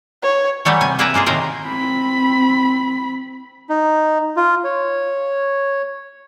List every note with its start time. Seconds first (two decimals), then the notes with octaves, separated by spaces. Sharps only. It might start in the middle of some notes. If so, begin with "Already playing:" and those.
0.22 C#5
0.65 E3 F#3 G3 A3 C#5
0.81 C3 G#5
0.99 C3 A#3 E4 B4 E5 A#5
1.14 G#3 A#3 F4 G#4
1.26 A2 C3 D#3 G#3 A#4 G5
1.66 C4 B5
3.69 D#4
4.36 F4
4.64 C#5